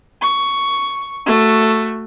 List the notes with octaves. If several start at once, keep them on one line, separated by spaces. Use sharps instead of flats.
C#6
A3 F#4